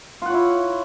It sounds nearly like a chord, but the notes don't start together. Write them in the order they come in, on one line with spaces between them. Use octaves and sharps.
F4 F#5 C#5 E4